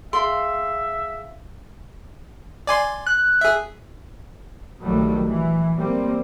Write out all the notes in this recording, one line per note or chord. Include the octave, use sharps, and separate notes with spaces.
G#4 E5 F5 C6
D5 G#5 C6
F#6
G#4 E5
A#1 D#3 F#3 G3 A3
E3
G3 A#3 C4